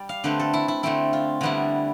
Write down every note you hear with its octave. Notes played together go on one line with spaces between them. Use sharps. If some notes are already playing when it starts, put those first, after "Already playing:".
Already playing: G3 D5
F5
D3 A3 C4 B4
A4
E4
E4
D3 A3 C4 E4
F4
D3 G3 B3 E4